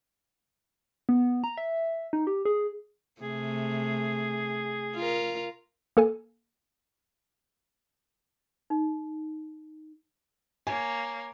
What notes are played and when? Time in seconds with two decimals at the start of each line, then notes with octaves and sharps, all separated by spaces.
1.09 B3
1.44 A#5
1.57 E5
2.13 D#4
2.27 G4
2.45 G#4
3.21 C3 A3 G#4
4.95 F4 A#4
5.97 A#3 A4 G#5
8.70 D#4
10.67 A#3 C#5 G#5